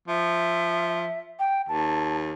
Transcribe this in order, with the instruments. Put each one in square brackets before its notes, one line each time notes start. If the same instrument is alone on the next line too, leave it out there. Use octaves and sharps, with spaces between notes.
[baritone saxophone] F3 [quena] E5
[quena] G5
[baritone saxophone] D#2 [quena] A5